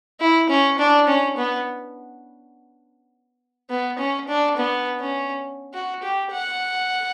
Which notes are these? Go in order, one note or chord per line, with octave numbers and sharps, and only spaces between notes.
E4
C#4
D4
C#4
B3
B3
C#4
D4
B3
C#4
F#4
G4
F#5